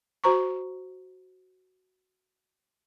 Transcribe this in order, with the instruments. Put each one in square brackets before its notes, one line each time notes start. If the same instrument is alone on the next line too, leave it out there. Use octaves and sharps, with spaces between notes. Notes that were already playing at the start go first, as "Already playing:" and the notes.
[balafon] F#4 C5 A#5 C#6